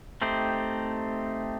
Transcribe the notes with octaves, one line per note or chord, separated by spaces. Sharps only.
A3 C4 D#4 G4 C5